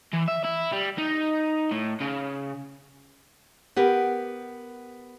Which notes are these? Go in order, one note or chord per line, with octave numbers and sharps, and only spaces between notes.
E3
E5
E4
G3
D#4
A2
C#3
B3 G4 A#4 B4